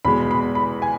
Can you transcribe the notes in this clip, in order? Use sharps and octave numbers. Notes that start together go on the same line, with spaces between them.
E2 B2 G#3 B5
B5
B5
G#5